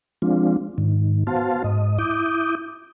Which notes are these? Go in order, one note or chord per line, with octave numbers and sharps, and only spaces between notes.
F3 G#3 C4 D4 F4
G#2 D#3
B3 F#4 C5 F5 A5
G#2 D#5
E4 D6 D#6 G6